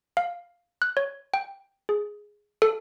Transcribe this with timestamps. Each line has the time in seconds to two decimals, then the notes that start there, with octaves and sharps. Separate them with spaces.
0.17 F5
0.82 F#6
0.97 C#5
1.34 G5
1.89 G#4
2.62 A4